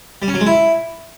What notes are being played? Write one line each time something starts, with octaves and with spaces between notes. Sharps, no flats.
G3
C#4
F#3
G#3
E4